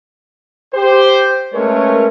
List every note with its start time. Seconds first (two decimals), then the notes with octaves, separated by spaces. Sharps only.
0.74 G4 C5
1.54 G#3 A3 C#4 A#4 B4 C#5